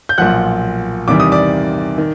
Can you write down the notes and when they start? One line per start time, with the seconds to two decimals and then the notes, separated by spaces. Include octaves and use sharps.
0.09 G6
0.18 B1 A#2 F3 F#5 F#6
1.08 E2 C3 D#3 G3 D6
1.20 D#6
1.32 D5 D6
1.98 D#3